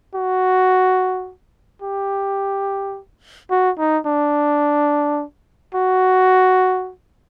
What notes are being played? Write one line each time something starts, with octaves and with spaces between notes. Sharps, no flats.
F#4
G4
F#4
D#4
D4
F#4